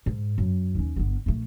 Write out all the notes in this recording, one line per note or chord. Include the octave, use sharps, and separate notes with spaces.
G#2
F#2
D#2 C#4
G1 B3
A#1 A3